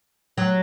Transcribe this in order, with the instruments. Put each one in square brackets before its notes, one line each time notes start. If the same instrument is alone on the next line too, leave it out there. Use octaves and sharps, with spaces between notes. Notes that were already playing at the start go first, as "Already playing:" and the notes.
[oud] F#3